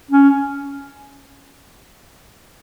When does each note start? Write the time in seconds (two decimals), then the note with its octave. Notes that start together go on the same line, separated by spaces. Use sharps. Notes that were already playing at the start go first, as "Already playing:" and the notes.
0.11 C#4